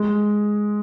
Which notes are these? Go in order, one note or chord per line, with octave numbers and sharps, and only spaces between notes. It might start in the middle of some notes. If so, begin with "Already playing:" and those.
Already playing: G#3